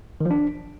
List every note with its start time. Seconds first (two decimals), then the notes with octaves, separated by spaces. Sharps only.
0.21 D#3
0.26 F3
0.31 D4